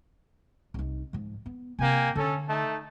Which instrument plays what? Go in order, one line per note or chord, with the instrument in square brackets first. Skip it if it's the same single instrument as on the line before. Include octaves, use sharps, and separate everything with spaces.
[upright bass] C2 D#4
G#2 F3
B3
[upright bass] C3 C4 [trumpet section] A#3 G5 G#5
[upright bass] D3 [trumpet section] C#4 A4
[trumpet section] A3 D#4 A5